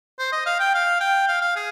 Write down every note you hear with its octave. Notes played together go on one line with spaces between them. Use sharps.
C5
D#5
F5
G5
F5
G5
F5
F5
G#4